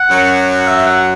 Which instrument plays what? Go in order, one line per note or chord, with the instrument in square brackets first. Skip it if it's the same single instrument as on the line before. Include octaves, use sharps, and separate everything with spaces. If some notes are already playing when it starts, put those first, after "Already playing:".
Already playing: [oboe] F#5
[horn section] F#2 F#3
[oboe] F#5
E5
F#5